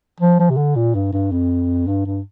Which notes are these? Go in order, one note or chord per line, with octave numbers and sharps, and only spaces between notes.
F3
F3
C3
D3
A#2
G2
G2
F2
G2
G2